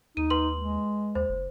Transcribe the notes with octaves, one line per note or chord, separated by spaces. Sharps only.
D#2 D#4 D#7
B4 C6 F#7
G#3
D#2 C5
F#1